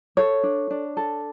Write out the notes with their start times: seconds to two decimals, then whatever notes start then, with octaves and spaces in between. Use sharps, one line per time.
0.17 A4 C#5
0.43 D4
0.70 D4
0.97 A4